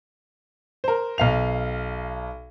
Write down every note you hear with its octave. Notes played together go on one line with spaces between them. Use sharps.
A#4 C5
B1 F5 F7